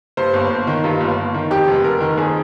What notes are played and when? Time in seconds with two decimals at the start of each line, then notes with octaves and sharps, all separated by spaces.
0.17 G2 C5
0.34 G1
0.51 G1
0.67 D#3
0.84 G2 F4
1.01 G1
1.17 G1
1.34 D#3
1.51 F2 G4
1.68 F1
1.84 F1 A#4
2.01 D#3
2.18 F2 G#4